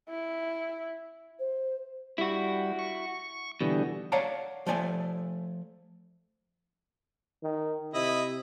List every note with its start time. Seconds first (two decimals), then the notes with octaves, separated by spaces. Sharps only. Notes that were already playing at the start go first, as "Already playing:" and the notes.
0.10 E4
1.39 C5
2.18 G3 E4 F#4
2.79 C#6
3.61 B2 D3 E3 G3
4.12 C#5 D5 F5 F#5 A5 A#5
4.66 F3 A3 D5 D#5 G#5
7.43 D#3
7.94 C3 E4 D#5